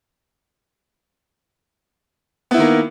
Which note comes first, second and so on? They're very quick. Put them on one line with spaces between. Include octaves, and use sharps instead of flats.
B3 E4 D#3 A#3